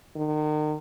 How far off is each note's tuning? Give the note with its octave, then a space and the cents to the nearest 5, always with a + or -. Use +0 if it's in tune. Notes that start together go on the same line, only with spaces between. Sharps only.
D#3 -35